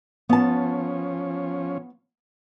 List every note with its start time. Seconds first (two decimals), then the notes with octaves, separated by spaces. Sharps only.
0.29 F3 B3 C#4 A5